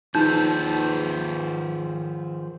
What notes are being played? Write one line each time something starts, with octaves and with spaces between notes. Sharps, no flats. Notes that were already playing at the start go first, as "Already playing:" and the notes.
D#3 F3 D#4 G#4 B4 G6